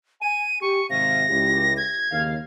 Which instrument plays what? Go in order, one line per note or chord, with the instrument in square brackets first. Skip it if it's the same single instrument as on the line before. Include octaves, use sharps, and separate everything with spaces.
[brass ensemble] G#5 [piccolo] D#7
[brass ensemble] G4 [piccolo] C#6
[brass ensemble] G#1 C3 F5 [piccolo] A#6
[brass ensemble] C#2 E4 G4
[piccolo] G#6
[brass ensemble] D#2 C#3 F5